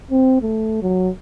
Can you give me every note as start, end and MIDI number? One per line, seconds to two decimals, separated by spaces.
0.11 0.42 60
0.42 0.79 57
0.82 1.09 54